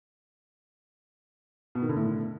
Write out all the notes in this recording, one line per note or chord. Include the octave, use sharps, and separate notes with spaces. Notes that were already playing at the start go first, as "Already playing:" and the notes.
B2
D#3
D3
A2